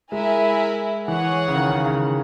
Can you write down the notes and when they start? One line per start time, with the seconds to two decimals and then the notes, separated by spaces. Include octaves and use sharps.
0.12 G#3 E4 A#4 E5 G#5
1.07 E3 G#4 C#5 F#5
1.48 C#3
1.55 D#3
1.70 C#3
1.86 C#3